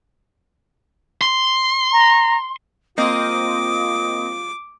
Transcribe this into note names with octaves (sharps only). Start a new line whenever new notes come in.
C6
A#5
A#3 C4 F4 D#5 D6 D#6